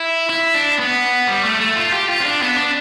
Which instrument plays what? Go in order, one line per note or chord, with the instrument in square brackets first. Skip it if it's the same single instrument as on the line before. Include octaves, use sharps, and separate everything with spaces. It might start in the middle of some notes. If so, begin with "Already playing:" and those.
Already playing: [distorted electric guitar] E4
E4
D4
B3
G3
A3
A3
F4
G4
F4
C4
D4
B3
D4